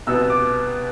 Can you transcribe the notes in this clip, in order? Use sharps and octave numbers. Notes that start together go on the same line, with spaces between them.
C2 B2 B3 E6
D6